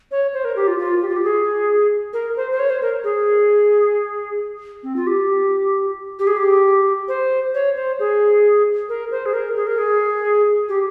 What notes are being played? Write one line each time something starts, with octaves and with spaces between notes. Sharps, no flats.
C#5
C5
A#4
G4
F4
F4
G4
F4
G4
G#4
A#4
C5
C5
C#5
C5
A#4
G#4
C4
F4
G4
G4
G#4
G4
C5
C#5
C5
G#4
A#4
C5
G#4
A#4
G#4
A#4
G#4
G4